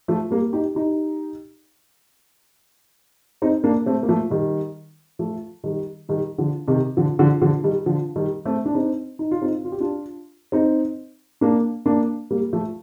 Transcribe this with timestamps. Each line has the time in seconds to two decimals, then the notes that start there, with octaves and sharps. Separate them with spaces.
0.08 F3 A3
0.31 G3 A#3
0.53 D#4 G4
0.75 D#4 G4
3.42 C4 D#4
3.64 A#3 D4
3.86 A3 C4
4.03 A#3
4.09 F3 A3
4.30 D#3 G3
5.19 F3 A3
5.64 D#3 G3
6.09 D#3 G3
6.38 D3 F3
6.68 C3 D#3
6.97 D3 F3
7.19 D3 F3
7.42 D3 F3
7.64 D#3 G3
7.86 D3 F3
8.16 D#3 G3
8.45 A3 C4
8.66 D4
8.75 C4 D#4
9.19 D#4
9.31 F4
9.42 C4 D#4
9.65 F4
9.72 G4
9.80 D4 F4
10.52 C4 D#4
11.41 A#3 D4
11.86 A#3 D4
12.31 G3 A#3
12.53 F3 A3